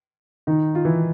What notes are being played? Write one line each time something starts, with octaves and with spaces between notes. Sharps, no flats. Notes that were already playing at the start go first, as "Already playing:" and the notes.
D#3 D#4
F4
E3 E4